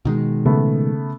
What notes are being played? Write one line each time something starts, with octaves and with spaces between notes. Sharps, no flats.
B2 D#3 G#3
C#3 A3 B3